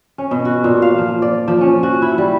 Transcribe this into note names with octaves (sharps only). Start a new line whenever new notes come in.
C#4
B2
F#4
A#2
F5
F3
D5
F3
C#4
F#4
E4
G3